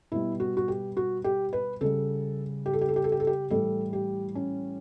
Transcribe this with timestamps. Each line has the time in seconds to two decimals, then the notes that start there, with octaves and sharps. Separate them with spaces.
0.12 B2 G3 E4
0.40 F#4
0.57 F#4
0.68 G4
0.97 F#4
1.24 G4
1.53 B4
1.81 C#3 G3 A4
2.66 G4
2.73 A4
2.81 G4
2.89 A4
2.96 G4
3.04 A4
3.12 G4
3.20 A4
3.27 G4
3.50 A2 E3 G3 A4
3.93 G4
4.35 C#4